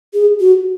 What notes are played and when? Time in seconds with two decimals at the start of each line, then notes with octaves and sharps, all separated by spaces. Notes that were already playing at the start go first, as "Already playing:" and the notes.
0.14 G#4
0.40 F#4